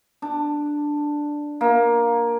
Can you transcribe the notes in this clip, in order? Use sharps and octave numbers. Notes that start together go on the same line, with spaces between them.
D4
A#3